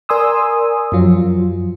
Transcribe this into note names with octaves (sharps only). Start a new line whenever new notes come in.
A#4 D5 G#5 C6 D#6 E6
F#2 F3 F#3 F4